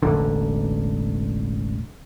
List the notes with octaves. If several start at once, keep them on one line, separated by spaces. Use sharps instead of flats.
E1 A1 D3